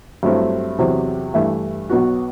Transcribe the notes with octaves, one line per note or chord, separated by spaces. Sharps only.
G2 F#3 A3 C4 E4
E2 C3 F#3 C4
G2 E3 A3 E4
B1 B2 F#3 B3 F#4